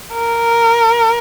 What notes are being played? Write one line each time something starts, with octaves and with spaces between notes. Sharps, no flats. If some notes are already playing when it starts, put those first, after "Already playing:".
A#4